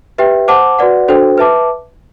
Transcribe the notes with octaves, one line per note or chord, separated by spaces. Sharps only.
G4 B4 E5 G5
C5 F#5 A5 D6
F#4 B4 D5 F#5
D4 F#4 A4 C5 G5
B4 E5 A5 D6